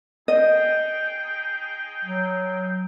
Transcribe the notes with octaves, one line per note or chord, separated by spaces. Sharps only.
D#4 G#4 D#5 G5
F#3